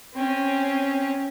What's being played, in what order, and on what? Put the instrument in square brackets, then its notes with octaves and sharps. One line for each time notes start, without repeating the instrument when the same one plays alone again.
[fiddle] C4 C#4